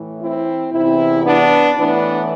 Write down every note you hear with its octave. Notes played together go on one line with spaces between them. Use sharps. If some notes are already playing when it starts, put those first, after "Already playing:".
Already playing: A2 E3
C4 E4
E2 C3 E3 C4 E4
B3 D4
A2 E3 B3 D4